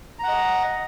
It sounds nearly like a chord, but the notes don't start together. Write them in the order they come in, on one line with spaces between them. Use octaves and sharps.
A#5 F#5 D#5